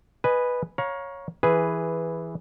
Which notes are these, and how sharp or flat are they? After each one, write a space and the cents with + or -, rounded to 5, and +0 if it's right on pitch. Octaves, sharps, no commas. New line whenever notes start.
B4 +0 D#5 -15 G#5 +0
C#5 +0 F5 +25 A#5 +25
E3 +0 G#4 +0 B4 +0